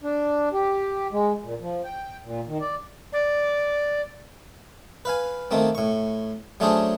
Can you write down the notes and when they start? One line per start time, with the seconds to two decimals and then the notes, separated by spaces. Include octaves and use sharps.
0.03 D4
0.53 G4
1.12 G#3
1.43 A#2
1.60 F3
1.84 G5
2.23 A#2
2.47 D#3
2.61 D5
3.12 D5
5.05 B4 F5 G#5
5.51 D#3 A3 A#3 C4
5.75 A2 C#6
6.60 F#3 A3 C#4 D4 G#4 C5